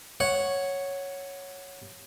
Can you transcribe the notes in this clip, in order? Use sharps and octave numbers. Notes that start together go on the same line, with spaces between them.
C#5 F#5